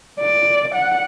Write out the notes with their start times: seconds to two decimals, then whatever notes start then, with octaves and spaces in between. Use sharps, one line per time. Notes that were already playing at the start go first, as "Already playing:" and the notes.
0.20 D5
0.75 F#5